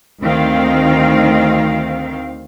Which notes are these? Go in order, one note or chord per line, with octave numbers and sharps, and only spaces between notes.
D2 D#3 C4 F5